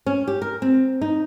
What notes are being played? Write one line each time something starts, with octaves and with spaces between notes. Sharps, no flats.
C#4
G4
A#4
C4
D#4